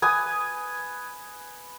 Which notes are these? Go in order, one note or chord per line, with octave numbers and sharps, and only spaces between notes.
B4 G#5 D#6